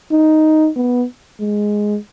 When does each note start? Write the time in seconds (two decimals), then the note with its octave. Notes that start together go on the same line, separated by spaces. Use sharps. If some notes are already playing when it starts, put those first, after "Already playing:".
0.12 D#4
0.76 B3
1.40 G#3